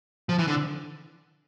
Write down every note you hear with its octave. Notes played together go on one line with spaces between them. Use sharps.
F3
E3
D3